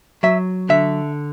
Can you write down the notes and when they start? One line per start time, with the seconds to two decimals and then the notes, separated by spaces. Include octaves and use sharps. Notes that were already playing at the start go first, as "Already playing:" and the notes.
0.23 F#3 E5
0.69 D3 E5